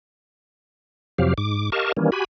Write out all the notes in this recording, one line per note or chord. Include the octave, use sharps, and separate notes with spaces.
F2 C3 F3 F#3 G4 F5
G#2 D6
G4 A#4 D#5 F5 A5 C#6
D#3 E3 G3 A#3 C#4
F#4 G4 G#5 B5